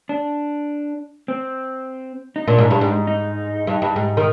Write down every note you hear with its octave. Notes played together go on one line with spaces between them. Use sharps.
D4
C4
D#4
A#2 D4
G#2
G2
G#2
D#4
G2
G2
G#2
D#3